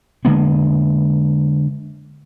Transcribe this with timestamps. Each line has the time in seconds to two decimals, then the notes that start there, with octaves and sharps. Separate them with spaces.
0.25 D3 G#3 A#3 B3